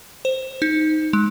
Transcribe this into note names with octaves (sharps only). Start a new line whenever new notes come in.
C5
D#4
G#3